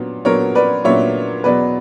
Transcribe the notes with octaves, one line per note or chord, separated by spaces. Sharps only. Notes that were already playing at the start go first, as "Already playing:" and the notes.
Already playing: A#2 F#3 B3 D4
A#2 F#3 B3 D4 A#4 C#5
B4 D5
A#2 F#3 B3 D4 C#5 E5
E2 B2 F#3 B4 D5